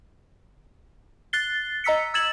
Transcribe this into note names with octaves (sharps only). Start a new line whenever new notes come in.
F#6 A6 C7 G7
D#5 A#5 E6 B6 C#7
E6 G#6 A6 E7 F#7